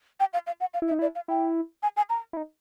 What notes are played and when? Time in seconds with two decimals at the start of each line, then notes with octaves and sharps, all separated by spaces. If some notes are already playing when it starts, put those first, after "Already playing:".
0.20 G5
0.33 F5
0.47 F5
0.60 F#5
0.74 F5
0.82 E4
0.88 E5
0.91 D#4
0.99 E4 D5
1.15 F5
1.28 E4 G5
1.83 G#5
1.97 G#5
2.10 A#5
2.33 E4
2.37 D#4